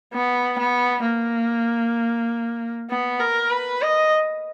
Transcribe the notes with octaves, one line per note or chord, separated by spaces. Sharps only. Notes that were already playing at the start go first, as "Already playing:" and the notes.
B3
B3
A#3
B3
A#4
B4
D#5